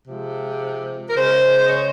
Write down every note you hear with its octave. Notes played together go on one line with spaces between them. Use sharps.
C3 F3 G#3
A#4
C#3 G#3 C5
D#5
C#5